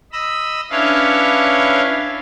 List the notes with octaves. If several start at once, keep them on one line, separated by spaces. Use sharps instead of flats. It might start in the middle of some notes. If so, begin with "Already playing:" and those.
D#5 B5 E6
C#4 D4 E4 B4 C#5 F5